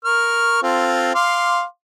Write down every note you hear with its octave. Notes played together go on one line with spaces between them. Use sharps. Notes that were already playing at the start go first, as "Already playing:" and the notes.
A#4 C#6 F6
C4 F4 A4
F5 C6 D6